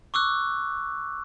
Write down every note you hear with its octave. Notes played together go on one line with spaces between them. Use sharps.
C#6 D6 E6 F#6